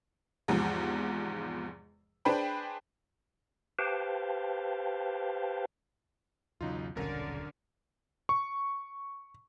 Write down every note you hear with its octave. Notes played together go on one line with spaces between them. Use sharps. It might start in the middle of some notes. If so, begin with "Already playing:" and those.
E2 G#2 C3 F3
D4 G#4 B4 C5 G5 B5
G4 B4 C5 F5 G5 A5
B1 E2 C#3 F#3 D#4 F4
D#1 B1 G2 D3 C#4 A#4 F6
C#6